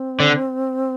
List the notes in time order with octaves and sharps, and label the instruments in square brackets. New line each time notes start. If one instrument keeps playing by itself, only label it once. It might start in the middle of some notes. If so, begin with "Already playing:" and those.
Already playing: [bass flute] C4
[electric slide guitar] D3